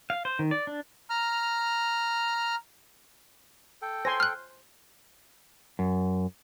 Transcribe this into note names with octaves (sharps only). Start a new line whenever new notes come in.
F5
C5
D#3
D5
D4
A#5 F6
A4 G5
C5 G#5 C6 A#6
F6 F#6
F#2